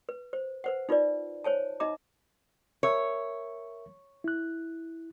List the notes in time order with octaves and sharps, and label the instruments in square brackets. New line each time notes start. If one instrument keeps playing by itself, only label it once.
[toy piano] B4
C5
B4 C5 F#5
D#4 F4 B4 D5
C5 C#5 G#5 A5
D#4 D#5 E5 A#5 D6
[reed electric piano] A#4 E5 [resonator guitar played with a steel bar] C#5
[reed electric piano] E4 F#6